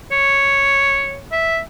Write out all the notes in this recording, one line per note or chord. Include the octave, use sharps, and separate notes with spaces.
C#5
E5